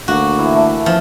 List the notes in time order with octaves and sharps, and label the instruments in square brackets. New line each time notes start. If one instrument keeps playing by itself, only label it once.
[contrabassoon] D2 [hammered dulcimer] A#3 [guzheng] F#4
[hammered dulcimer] E3 E4
A3
[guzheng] F3 [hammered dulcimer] B3